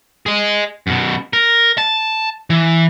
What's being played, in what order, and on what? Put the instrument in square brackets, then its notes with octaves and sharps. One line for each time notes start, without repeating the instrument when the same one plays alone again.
[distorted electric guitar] G#4 D#5
F#2 B2
A#4
A5
E3